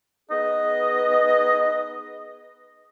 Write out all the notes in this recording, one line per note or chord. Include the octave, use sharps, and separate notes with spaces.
B3 D#4 G#4 B4 D#5